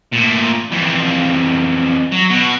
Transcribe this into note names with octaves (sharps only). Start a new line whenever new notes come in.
A#2 A3
F2 E3
F#3
B2 F#4